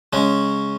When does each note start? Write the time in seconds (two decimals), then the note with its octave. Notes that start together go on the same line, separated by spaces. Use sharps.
0.13 C#3 G#3 C#4